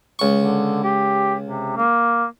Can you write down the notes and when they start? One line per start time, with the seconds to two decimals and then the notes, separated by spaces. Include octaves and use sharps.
0.19 C#2 C#6
0.37 D3
0.84 G4
1.45 C3
1.77 A#3